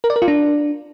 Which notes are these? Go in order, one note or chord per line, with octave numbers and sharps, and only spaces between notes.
A#4
D5
A#4
F4
D4